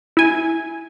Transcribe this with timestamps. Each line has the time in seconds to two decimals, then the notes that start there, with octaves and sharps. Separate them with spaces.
0.17 E4 G#5